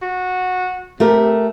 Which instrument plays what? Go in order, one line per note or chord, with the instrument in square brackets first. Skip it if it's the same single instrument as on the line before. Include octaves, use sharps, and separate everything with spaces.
[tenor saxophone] F#4
[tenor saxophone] C3 [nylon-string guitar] A3 G4 A#4